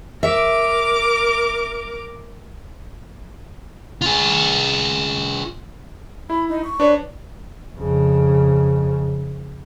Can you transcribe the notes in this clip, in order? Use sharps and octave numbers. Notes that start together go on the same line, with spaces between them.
A#4 E5 D6
F4 G#4
E4 B5
D#4
C#6
D4 B4 C#5 D5
F2 C#3